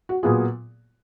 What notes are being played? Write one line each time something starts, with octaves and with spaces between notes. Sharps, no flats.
F#4
A#2 F#3 B3 F4 G#4